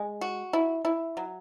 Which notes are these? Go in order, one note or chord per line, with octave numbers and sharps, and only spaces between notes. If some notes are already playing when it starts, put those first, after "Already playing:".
Already playing: G#3
F#4
E4
E4
F#3